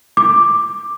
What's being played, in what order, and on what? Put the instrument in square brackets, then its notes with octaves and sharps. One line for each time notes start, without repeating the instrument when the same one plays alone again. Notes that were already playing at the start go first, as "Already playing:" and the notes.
[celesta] D6